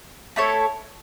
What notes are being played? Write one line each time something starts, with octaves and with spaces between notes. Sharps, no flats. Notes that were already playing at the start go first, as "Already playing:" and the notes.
A3 E4 A4 C#5